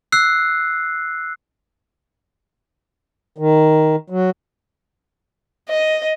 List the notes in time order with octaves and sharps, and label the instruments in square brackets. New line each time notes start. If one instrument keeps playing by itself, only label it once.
[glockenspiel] E6 F#6 C7
[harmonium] D#3
F#3
[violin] D#5